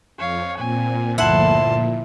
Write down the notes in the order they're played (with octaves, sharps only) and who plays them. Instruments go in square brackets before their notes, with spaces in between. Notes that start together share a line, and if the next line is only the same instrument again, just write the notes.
[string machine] F2 [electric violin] C#5 F5
[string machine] A#2 [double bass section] C4 [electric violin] G#5
[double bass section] G1 D2 F3 [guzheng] E4 F#5 [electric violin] A5 C6